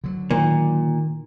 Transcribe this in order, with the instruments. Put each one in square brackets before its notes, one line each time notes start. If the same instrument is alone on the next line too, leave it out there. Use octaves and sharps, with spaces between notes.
[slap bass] D3 F#3
[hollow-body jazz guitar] A#2 [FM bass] D#3